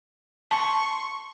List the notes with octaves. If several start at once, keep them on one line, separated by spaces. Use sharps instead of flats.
A5 C6 C#6